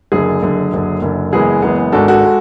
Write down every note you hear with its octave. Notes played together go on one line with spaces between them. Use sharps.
F#1 F#2 D3 G#4
F#1 F#2 D3
F#1 F#2 D3
F#1 F#2 D3
F#1 F#2 E3 G#3 B3 G#4
F#1 F#2 E3 G#3 B3
G#1 G#2 G#3 D4 F#4 A4
F#4 A4
G#3